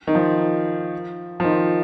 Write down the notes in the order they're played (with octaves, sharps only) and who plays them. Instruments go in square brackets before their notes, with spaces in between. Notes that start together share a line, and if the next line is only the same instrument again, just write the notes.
[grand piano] D#3
F3
F3
D#3